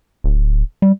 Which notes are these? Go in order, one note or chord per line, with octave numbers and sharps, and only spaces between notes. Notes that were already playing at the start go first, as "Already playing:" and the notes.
D1
G3